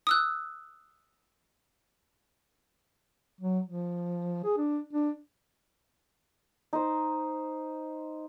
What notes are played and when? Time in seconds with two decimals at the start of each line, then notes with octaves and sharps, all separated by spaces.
0.07 D#6 E6 F#6
3.41 F#3
3.66 F3
4.44 G#4
4.57 D4
4.93 D4
6.73 D#4 C5